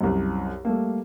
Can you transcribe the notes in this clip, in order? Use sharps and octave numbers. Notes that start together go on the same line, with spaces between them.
C2 F#2
G3 A3 A#3